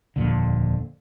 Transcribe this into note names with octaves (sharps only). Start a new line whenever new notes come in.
D#1 F2 A#2 D3